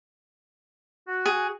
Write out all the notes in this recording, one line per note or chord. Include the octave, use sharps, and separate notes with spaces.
F#4
G#4